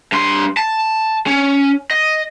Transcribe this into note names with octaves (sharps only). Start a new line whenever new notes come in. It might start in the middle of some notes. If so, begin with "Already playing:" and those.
G2 C6
A5
C#4
D#5